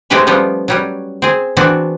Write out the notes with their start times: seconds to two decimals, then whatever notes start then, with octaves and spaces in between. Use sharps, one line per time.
0.10 G#3 A3 C4 G4 B4 C#5
0.27 F3 G3 B3 C#4
0.68 F#3 G3 C#4
1.22 C4 G#4
1.57 E3 B3 C4 D4 F#4